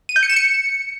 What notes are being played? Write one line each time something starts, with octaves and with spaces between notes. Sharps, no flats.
D#7
G6
C#7
E7
C#7